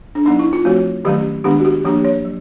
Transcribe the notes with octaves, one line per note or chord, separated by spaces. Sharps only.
D4
F#3 B3 D4 D#4
E4
F4
F3 A3 C4 F#4
D#3 F#3 A3 C#4 G4
D#3 G#3 B3 D4 G4
F#4
G4
F3 A#3 D4 G4
C#5
F#3